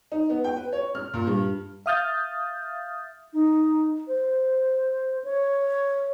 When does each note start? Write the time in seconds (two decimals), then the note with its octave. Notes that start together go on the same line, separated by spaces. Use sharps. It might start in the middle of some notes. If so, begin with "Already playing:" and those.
0.12 D#4
0.30 B3
0.44 G5
0.57 B4
0.72 C#5
0.95 F6
1.14 A#2
1.27 G2
1.86 E5 F5 D#6 F6 G6 A6
3.33 D#4
4.07 C5
5.24 C#5